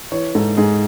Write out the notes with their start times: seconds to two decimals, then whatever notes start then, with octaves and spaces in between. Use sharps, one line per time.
0.12 E3 C#5
0.35 G#2 A4
0.57 G#2 G#4